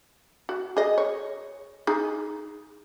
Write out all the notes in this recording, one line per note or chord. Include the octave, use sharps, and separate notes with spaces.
F#4
G#4 D#5
C#5
D#4 G#4